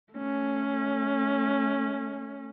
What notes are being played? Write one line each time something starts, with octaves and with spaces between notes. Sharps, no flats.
A3 C#4